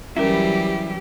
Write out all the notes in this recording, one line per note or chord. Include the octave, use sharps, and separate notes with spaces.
E3 F#3 G3 C#4 E4 G4 A#4